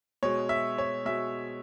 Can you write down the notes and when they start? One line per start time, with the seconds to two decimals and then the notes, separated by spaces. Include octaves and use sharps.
0.23 B2 G#3 C#5
0.49 E5
0.78 C#5
1.05 B2 G#3 E5